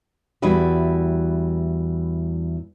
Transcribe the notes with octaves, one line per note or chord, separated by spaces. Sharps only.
E2 G3 E4 F#4 B4